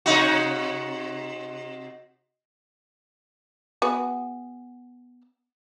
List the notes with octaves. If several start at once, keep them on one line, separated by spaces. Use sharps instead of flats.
C3 D#4 F#4
B3 F#4 G#4